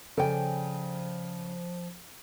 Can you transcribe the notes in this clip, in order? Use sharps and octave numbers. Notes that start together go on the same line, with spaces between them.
C#3 F3 A4 D5 G5 G#5